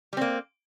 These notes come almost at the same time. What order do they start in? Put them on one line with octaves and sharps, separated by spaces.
G3 C4 A#3